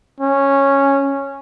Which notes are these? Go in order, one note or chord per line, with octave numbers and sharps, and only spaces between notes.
C#4